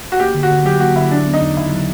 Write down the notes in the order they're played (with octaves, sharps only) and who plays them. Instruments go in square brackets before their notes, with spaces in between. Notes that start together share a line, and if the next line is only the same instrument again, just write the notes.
[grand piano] F#4
[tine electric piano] A#3 [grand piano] G4
[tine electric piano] D3
[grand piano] F#4
[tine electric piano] D3
[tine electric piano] F#3 [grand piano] G4
[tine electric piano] A#3 [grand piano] F#4
[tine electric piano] D3 [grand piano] E4
[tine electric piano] F#3 [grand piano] D4
[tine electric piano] B3
[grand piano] D#4
[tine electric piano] E2
[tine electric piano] C#3 [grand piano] E4
[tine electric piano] F#3